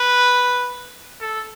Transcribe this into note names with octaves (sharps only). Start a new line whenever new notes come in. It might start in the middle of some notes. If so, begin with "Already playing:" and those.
Already playing: B4
A4